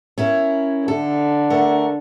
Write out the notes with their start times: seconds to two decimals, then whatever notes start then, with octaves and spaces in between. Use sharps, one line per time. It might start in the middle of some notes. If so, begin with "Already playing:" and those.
0.18 C#4 E4 A#4
0.88 D3 A4
1.50 A3 A#4 F#5